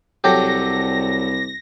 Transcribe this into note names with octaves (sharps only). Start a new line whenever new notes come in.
C2 F#3 G4 A4 A#6